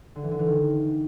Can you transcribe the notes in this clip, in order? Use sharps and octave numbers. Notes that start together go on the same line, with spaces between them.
D3
E3
D3
E3
D#3